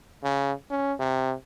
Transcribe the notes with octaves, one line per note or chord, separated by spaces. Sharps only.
C#3
C#4
C3